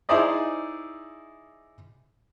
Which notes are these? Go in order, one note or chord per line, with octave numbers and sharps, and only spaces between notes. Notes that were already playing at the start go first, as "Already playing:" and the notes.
D#4 E4 G#4 C5 D5 D#5